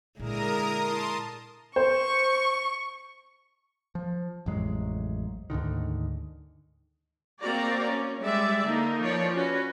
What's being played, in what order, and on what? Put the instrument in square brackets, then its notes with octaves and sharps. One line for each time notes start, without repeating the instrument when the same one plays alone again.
[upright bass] A#2 [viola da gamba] D3 G#3 E4 [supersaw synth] A#4 A#5 D#6
[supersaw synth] A5 C6 D#6
[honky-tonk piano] C5 [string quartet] C#6
[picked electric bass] F3
A1 F2 F#3 G#3
D2 G#2 D3 D#3
[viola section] A#3 C4 F#4 D5 A#5
C#4
G3 G#3 D5 E5
D3 A#3 D#4
F3 C#5 D5
C#4 F#4 B4